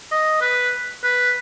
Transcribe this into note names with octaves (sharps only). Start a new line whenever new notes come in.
D#5
B4
B4